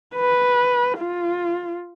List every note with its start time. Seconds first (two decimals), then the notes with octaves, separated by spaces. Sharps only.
0.16 B4
0.98 F4